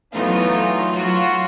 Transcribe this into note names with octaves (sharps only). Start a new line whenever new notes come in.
E3 F#3 A3 B3 D#4 F4
F#3 F4 F#4